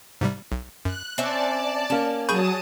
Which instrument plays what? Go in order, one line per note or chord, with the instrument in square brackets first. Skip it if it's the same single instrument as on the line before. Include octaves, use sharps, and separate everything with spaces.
[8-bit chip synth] G#2 C3 G3
B1
[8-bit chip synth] F#2 [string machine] F#6
[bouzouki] C4 C#4 E5 [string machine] D5 A5
[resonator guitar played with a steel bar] A#3 C#4 [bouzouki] A5
[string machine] F#3 A5 D#6 [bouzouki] G#4 [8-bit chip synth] B5 C#6 G6